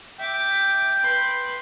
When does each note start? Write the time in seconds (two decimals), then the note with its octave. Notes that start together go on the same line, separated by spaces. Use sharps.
0.20 E5 G5 D6
1.03 B4 C6